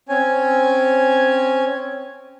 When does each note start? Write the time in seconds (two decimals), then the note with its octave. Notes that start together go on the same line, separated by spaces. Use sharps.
0.09 C4 C#4 C#5 G#5